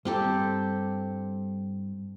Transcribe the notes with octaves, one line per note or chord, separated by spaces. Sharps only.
G2 C4 G4 A4 A#5